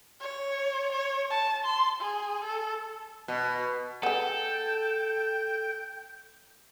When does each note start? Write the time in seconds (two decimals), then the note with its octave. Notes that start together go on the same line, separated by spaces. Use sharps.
0.21 C#5
0.92 C#5
1.30 A5
1.65 C6
2.01 G#4
2.44 A4
3.28 B2
4.03 B3 G#4 A4 G5